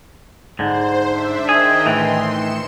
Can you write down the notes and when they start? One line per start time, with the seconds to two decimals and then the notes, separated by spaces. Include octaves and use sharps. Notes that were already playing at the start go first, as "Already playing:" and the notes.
0.59 G#2 D3 C5
1.07 D4 E5
1.49 D#3 G#4 D#5 G5
1.86 A2 E3 C6
2.25 C#7 E7